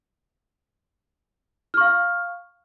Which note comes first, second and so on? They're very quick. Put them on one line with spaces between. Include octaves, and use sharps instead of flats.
F6 C#6 F5